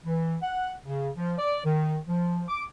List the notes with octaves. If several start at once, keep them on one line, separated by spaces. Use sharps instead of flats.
E3
F#5
C#3
F3
D5
D#3
F3
D6